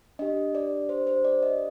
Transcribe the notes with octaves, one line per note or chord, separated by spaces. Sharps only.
D4 G4 D#5
D5
C5
C5
D5
D#5